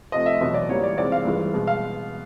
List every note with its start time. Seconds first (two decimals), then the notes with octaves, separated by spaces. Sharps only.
0.12 C3 F3 A3 D#5
0.26 E5
0.40 E2 B2 F#3 D#5
0.54 D5
0.69 G#2 E3 G3 A#3 C#5
0.84 D5
0.98 C3 E3 G#3 D5
1.12 F5
1.25 G2 E3 G#3
1.54 B2 G#3
1.67 F5